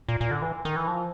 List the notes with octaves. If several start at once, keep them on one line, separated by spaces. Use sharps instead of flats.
A#2
A#2
D3
E3
D#3
E3
F3